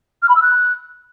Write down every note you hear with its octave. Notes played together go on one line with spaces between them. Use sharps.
F6
B5
E6
F#6